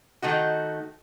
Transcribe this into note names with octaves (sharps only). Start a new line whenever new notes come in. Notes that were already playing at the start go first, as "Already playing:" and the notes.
D#3 A3 D#4 F#4